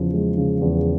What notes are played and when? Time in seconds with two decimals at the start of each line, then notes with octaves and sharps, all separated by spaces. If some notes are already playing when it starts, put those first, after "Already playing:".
Already playing: E2 C#3 F3
0.14 G#3
0.38 C#3
0.61 E2